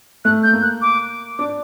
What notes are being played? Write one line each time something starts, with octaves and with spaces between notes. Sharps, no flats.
A3 F#6
G6
A#3
F#6
D6
D4 D6